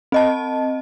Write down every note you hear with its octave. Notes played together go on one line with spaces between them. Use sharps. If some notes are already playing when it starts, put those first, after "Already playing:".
C4 D#5 A5